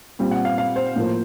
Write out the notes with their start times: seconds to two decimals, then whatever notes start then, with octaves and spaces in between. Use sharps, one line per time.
0.19 A#2 G3 C4
0.31 F#5
0.45 F5
0.58 F5
0.76 C5
0.96 A2 F3 A#3